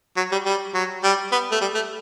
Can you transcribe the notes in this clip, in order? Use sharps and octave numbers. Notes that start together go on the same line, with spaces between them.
F#3
G3
G3
F#3
G3
B3
A3
G3
A3